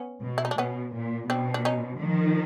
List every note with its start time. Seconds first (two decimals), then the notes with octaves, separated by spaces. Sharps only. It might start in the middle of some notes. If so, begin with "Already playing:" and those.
Already playing: B3 C#4
0.23 B2
0.38 E4
0.45 D#4
0.51 D4
0.58 B2 B3 C#4
0.94 A#2
1.29 B2 C4 D4
1.54 D4
1.65 C#4 D#4
2.00 D#3 F3